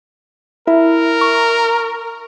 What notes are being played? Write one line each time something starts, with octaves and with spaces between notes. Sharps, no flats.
E4 A#4 E5
C#6